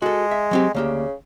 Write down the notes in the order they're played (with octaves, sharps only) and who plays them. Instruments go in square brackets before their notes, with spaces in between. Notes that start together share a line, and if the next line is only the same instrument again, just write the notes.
[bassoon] G#3 [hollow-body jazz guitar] F#4 A4
[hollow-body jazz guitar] E5
F#3 C4 G4
[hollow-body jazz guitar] D2 A#3 G4 [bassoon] C#3